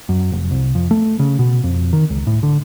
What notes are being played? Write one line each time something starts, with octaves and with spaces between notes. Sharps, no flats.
F#2
F1
C2
F2
A3
C#3
B2
F2
D#3
C#2
A2
D3